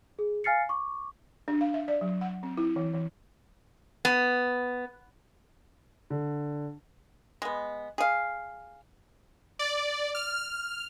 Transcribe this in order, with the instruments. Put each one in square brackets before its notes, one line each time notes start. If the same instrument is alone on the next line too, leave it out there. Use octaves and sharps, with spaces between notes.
[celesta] G#4
F5 G#5 F6 A6 C7 C#7
C#6 D6
[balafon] D4
F5
E5
D5
F#3
F#5
C4
E4
E3
E3
[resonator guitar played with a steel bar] B3
[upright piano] D3
[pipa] G#3 B3
G#4 F5
[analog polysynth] D5
F6